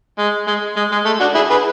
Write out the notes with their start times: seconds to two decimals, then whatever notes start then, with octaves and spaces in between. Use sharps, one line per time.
0.18 G#3
0.47 G#3
0.76 G#3
0.92 G#3
1.05 A3
1.20 D4 F#4
1.35 E4 G#4
1.49 G#4 B4